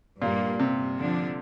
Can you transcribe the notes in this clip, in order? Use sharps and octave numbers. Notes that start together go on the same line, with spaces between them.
G2 A#2 G3 A#3
C3
D3 F3 D4